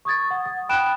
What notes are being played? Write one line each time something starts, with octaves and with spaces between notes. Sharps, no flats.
C#6 D#6 G#6 A6
F#5
D#6
G5 B5 F#6 D7 E7